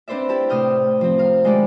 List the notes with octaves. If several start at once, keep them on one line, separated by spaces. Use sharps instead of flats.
C4 D4 B4 C5 D5 E5
E4 G4 A5
A2 C3 D#6 F6 G6
F3 C4
A#4 F5
D#3 G#3 D4 E4 G4 D5